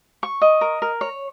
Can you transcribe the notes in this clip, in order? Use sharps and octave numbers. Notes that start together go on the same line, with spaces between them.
C#6
D#5
A#4
A#4
C#5